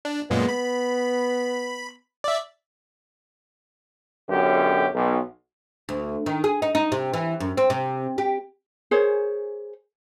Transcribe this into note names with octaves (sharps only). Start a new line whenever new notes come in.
D4
F#2 A#2 G#3 B3
B5
D5 E5
B1 F#2 D3 G4
B1
D2
D#3
G#4
D#4
D#4
C3
E3
F#2
C4
C3
G4
G#4 A#4 C5 C#5